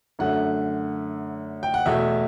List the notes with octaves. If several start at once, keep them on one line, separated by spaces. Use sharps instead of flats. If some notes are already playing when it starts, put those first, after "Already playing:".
F#2 D3 A3 F#5
G5
F#5
E2 B2 A3 E5